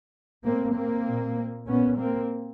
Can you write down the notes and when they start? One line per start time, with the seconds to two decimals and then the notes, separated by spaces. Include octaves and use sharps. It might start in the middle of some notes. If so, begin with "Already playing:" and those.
0.44 A2 A#3 C4
0.74 A#3 C4
1.05 A#2
1.66 A#2 B3 C#4
1.97 A#3 C4